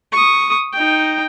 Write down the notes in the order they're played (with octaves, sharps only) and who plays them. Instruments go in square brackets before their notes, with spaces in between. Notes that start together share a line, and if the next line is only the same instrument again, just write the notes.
[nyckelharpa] C#6 D#6
D#4 G5